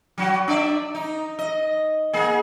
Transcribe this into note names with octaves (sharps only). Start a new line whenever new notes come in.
F#3 F#4
D4 D5 E5
D#4
D#5
A#3 G#4